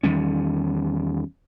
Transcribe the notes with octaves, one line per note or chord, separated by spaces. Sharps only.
E2 D#3 G3 C#4